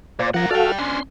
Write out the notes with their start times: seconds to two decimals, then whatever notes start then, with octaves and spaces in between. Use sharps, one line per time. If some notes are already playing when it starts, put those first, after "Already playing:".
0.19 A#2 C5 D5
0.34 F3 A#4 F#5
0.51 F#4 A4 D5 F5 G5
0.79 C#4 D4 C6